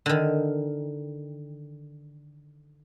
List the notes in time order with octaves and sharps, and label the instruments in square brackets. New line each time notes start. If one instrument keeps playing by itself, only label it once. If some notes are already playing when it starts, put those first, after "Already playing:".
[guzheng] D3 D#3